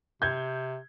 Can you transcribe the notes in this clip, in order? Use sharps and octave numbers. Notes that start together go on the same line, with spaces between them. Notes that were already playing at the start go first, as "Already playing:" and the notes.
C3 G6 G#6